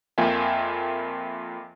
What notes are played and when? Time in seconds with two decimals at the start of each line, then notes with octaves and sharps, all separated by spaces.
0.18 F2 A#3 F4 E5 G5 G#5